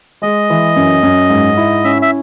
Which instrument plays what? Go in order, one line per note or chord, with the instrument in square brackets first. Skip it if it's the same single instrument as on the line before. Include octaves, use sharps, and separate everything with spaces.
[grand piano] G#3 [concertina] D#5
[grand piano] E3
F#2
F#2
G#2
E4
[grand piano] C#4 [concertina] E5
[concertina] E5